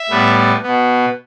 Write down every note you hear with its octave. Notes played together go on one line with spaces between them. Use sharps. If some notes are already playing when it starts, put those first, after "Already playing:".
Already playing: E5
A2 G3 B3
B2 B3